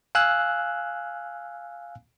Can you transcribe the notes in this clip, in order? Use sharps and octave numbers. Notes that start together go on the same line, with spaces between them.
F5 G#5 E6 F#6